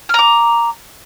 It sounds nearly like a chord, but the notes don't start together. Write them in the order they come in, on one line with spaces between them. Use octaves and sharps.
F6 A#5 D6